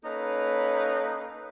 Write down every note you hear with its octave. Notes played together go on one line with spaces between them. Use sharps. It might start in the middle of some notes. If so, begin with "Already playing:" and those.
A#3 C#4 D#4 A4 B4